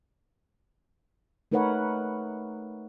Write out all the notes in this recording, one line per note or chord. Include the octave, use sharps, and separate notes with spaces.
A3 D#4 A#4 B4 C#5 F#5